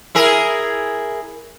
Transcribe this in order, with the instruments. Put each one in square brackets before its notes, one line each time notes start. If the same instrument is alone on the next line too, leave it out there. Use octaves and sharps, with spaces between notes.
[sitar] E4 G#4 A#4